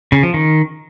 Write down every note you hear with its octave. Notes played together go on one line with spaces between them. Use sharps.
C#3
F3
D#3